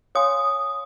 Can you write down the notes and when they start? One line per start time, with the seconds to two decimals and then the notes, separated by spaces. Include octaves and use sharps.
0.15 C#5 F5 G#5 C6 D#6